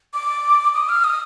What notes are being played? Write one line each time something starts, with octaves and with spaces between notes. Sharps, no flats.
D6
D#6
F6
D#6